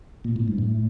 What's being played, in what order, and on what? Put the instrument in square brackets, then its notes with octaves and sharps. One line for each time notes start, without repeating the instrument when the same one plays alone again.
[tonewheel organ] A#2
A2
G2
A2